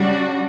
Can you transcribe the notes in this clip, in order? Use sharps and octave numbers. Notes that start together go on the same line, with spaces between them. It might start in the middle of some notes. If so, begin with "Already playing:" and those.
Already playing: C#3 G3 D4 F#4